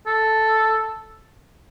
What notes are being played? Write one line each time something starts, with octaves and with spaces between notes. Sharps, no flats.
A4